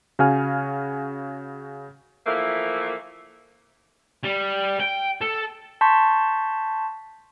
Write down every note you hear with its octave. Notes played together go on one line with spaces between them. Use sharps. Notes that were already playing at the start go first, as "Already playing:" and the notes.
C#3 F#4 F5 G#5 F6
E3 F3 A3 A#3
G3
G5
A4
A5 C6 C#6 G6 B6